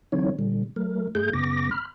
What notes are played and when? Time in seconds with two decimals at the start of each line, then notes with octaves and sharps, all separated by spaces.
0.12 D3 E3 F#3 C4 D#4 C#5
0.39 A#2 D3 G3
0.76 F#3 A3 A#4
1.15 G2 A3 G#4 G6
1.33 F#2 C#3 B3 D6 A#6
1.71 B5 F6